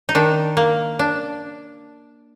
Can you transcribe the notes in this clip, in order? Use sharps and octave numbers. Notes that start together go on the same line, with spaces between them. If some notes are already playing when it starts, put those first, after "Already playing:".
D#4
D#3 D4
A#3
D4